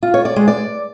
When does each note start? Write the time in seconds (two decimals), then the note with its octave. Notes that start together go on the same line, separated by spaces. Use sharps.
0.03 F4
0.14 C#5
0.25 D5
0.36 G#3
0.48 D5